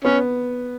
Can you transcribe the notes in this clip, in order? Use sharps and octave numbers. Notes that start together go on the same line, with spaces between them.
B3 C#4